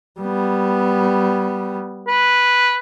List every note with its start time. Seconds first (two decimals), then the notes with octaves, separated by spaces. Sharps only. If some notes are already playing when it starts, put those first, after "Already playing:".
0.21 G3 B3
2.08 B4